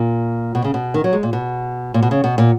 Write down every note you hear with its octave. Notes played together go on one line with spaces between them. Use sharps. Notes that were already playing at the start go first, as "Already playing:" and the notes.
Already playing: A#2
B2
C#3
B2
D#3
F#3
G#3
A#2
B2
A#2
B2
C#3
B2
A#2